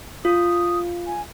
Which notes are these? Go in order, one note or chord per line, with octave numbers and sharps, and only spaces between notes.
F4 D#6
G#5